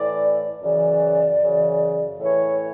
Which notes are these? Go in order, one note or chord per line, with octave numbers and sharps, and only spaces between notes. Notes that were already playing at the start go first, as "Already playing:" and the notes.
Already playing: A2 E3 D5
F#2 C#3 E3 D5
F#2 C#3 E3
A2 E3 C#5